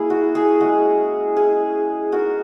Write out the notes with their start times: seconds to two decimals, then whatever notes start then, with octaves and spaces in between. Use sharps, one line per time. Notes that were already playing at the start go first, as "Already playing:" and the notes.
Already playing: A#3 E4 G#4
0.10 F#4
0.35 G#4
0.61 G#3 C#4 E4 F#4
1.36 G#3 C#4 E4 G#4
2.12 G#3 D#4 F#4 A#4